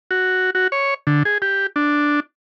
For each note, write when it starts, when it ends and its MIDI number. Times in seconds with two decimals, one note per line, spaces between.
0.11 0.50 66
0.55 0.68 66
0.72 0.94 73
1.07 1.23 50
1.25 1.38 68
1.42 1.67 67
1.76 2.20 62